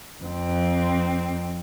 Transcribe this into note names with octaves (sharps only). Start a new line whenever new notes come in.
F2 C4